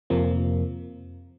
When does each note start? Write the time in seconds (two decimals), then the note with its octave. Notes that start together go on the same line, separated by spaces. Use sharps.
0.10 F2 C3 F3 A#3